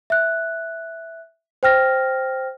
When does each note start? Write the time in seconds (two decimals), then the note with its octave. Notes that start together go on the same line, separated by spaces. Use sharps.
0.10 E5 F#6
1.63 C5 G5 F6 A#6